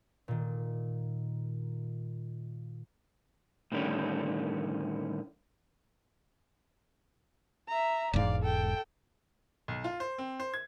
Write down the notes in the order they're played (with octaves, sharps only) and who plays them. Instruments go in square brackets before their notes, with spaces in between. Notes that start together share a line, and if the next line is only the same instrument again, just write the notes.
[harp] A#2 D#3
[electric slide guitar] A2 D3 D#3 G3 C#4
[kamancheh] E5 A#5
[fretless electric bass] E1 G#2 [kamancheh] D5 F5
[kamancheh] A4 G5
[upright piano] B1
F4
C5
C4
C5
G#6